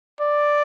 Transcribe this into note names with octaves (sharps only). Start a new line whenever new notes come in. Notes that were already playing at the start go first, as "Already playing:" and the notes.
D5